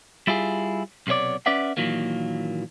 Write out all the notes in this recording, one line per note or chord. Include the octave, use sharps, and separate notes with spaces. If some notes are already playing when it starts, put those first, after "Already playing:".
G3 E4 F4 G#4
B1 C3 B3 C#5 D5
C#4 B4 D5 E5 F#5
A#2 D#3 E3 F#3 A#3